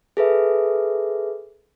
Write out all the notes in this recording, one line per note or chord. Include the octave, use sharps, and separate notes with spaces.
G#4 A4 B4 E5